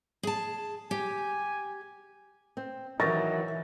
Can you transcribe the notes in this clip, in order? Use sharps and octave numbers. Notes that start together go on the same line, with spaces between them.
G#4 A5
G4 G#5
C4
D#3 E3 F#3 C#6 A6 A#6